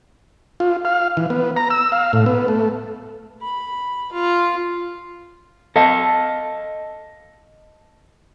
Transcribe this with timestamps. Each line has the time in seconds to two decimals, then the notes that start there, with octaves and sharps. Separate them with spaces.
0.60 F4
0.85 F5
1.17 E3
1.30 B3
1.57 A#5
1.70 E6
1.92 F5
2.13 A2
2.26 B3
2.48 A3
3.42 B5
4.12 F4
5.76 A4 D#5 F5 A5